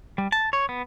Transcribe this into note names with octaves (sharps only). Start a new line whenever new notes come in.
G3
A5
C#5
B3